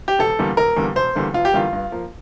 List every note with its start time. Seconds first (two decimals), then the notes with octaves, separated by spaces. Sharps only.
0.08 G4
0.19 E1 A4
0.39 E2 D3 G3 A#3
0.57 E1 A#4
0.77 E2 D3 G3 A#3
0.96 E1 C5
1.15 E2 D3 G3 A#3
1.34 E1 F4
1.45 G4
1.53 E2 D3 G3 A#3 F4
1.73 G2
1.92 F3 A#3